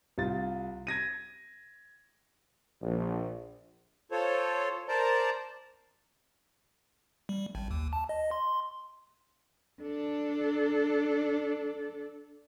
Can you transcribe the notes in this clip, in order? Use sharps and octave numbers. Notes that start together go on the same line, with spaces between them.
C2 F4 A6
G#6 A#6 D#7
A#1
F4 A4 C5 C#5
A#4 C5 D5 A5 A#5
G3
G#1
D#2
A5
D#5
C6
D4 A4